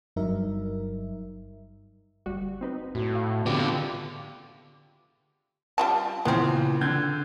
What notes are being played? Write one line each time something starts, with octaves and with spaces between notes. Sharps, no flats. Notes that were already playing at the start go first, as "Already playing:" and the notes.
G1 G2 F#3 D#4 A#4 E5
G1 G3 F#4
C4 D#4 B4
A2 F#4
F5
D3 B3 F4 G4 G#4 B4 D6
G3 F4 A5
A#2 C#3 E3 B3 C4
D3 G6 G#6